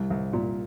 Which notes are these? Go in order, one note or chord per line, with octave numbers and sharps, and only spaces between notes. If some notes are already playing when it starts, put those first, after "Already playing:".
Already playing: C2
C2
A#2